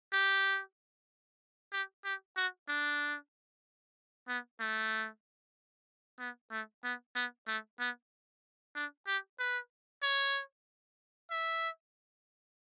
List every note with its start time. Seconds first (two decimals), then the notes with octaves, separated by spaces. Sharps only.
0.13 G4
1.72 G4
2.04 G4
2.36 F#4
2.68 D4
4.28 B3
4.60 A3
6.19 B3
6.51 A3
6.84 B3
7.15 B3
7.47 A3
7.79 B3
8.75 D4
9.07 G4
9.39 B4
10.03 C#5
11.31 E5